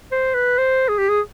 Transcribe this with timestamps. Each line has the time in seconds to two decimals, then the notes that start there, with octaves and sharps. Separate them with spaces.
0.12 C5
0.35 B4
0.58 C5
0.89 G#4
0.99 G4
1.10 G#4